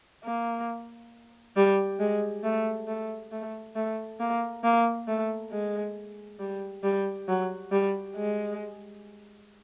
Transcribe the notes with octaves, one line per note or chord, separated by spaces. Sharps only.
A#3
G3
G#3
A3
A3
A3
A3
A#3
A#3
A3
G#3
G3
G3
F#3
G3
G#3